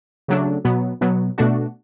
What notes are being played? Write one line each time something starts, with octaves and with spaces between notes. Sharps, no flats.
C#3 F#3 A3 D4
B2 F#3 B3
B2 F#3 B3
B2 A3 D4 F#4